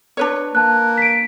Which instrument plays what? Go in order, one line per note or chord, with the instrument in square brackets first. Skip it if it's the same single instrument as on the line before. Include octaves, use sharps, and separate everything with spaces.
[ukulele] D4 B4 C#5
[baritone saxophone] A#3 [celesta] A5 F#6
[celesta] B6 D7